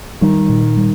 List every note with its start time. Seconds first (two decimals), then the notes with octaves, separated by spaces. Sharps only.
0.21 D#3 G3
0.49 A#2
0.77 G3